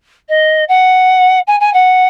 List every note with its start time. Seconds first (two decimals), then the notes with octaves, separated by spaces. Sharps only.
0.28 D#5
0.68 F#5
1.47 G#5
1.60 G#5
1.73 F#5